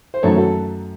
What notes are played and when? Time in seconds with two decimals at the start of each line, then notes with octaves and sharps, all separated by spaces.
0.14 C5
0.23 F#2 D#3 F#3 A3 A4 C#5
0.37 F#4 A4